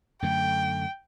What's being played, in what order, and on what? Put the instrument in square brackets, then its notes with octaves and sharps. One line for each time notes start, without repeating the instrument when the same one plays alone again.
[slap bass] F#2 D3 A3 [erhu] G5